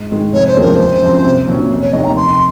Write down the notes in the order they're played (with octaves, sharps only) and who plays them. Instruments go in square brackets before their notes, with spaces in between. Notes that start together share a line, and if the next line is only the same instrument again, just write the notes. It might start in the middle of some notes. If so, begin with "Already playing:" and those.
Already playing: [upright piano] G#2
D#3 G#3 D#4
[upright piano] F1 [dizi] C#5
[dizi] C5
[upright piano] D#2 C#3 F3 G#3 [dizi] A#4
[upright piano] F#1 [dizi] C5
[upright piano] F#2 F3 C4
C2
A#2 F#3 C#4
F1
[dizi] C#5
[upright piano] D#2 D#3 A#3 [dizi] D#5
[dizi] A#5
[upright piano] F1 [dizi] C6